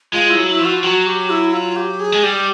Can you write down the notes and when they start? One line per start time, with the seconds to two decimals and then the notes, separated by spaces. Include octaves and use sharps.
0.13 G#3 F4
0.30 E4
0.35 F#3
0.48 E4
0.60 F3
0.65 F#4
0.83 F#3 F#4
1.06 G4
1.30 E4
1.53 F4
1.76 G4
2.00 G#4
2.12 G#3
2.23 G3 G4